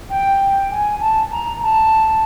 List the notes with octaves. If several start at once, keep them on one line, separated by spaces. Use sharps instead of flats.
G5
G#5
A5
A#5
A5